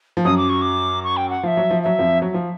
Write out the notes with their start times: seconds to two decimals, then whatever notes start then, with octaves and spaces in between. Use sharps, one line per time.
0.17 F3
0.25 F#2 F#3 D#6
0.37 D6
0.49 C#6
0.61 D6
1.04 C#6
1.17 G5
1.30 F#5
1.43 F3 F5
1.47 E5
1.57 F#3
1.70 F3
1.83 F#3 E5
1.99 F2 F3
2.22 F#3
2.34 F3